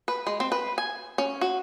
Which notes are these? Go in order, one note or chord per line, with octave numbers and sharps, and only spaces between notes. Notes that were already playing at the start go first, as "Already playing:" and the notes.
B4
G#3
C4
B4
G#5
C#4
F#4